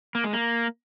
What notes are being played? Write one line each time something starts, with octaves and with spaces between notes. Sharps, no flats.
A#3
G#3
A#3